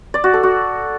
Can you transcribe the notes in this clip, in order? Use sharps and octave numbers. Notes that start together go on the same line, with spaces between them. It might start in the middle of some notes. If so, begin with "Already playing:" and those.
D5
F#4
A4
F#4